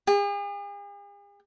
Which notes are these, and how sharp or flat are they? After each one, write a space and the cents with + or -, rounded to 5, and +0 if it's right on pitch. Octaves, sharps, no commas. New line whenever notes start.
G#4 -45